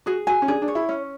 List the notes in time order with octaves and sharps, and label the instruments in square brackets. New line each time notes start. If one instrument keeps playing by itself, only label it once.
[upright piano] F#4 [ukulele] G#4
[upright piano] F#4 [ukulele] G#5
[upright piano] C#4
[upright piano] D4 [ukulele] G#4
[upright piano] D4
[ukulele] C#5
[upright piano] E4
[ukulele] C#4